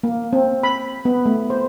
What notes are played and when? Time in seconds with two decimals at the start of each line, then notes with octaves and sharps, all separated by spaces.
0.03 A#3
0.33 C4
0.63 B5
1.05 B3
1.26 A3
1.50 C5